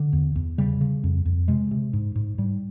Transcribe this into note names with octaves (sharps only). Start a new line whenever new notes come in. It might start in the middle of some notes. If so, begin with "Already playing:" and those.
Already playing: D3
E2
E2
C#3 G3
C#3
F2
F2
C3 G#3
C3
G#2
G#2
G#2 G3